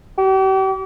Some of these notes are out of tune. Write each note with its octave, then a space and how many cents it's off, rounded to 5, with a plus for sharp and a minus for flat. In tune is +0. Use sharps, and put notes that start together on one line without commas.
G4 -40